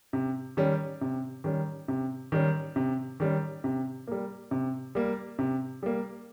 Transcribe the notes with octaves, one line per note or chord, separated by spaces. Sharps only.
C3
D#3 G3 C#4
C3
D#3 G3 C#4
C3
D#3 G3 C#4
C3
D#3 G3 C#4
C3
G3 A#3
C3
G3 A#3
C3
G3 A#3